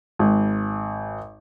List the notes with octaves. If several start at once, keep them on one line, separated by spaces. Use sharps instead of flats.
G#1